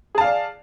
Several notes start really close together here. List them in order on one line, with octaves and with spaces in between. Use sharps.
G#4 A5 F5 D5